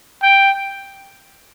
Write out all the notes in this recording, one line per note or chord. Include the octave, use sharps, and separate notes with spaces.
G5